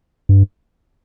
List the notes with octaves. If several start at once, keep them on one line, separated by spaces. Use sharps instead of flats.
G2